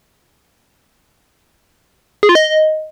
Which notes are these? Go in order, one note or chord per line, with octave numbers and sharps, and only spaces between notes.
G#4
F4
D#5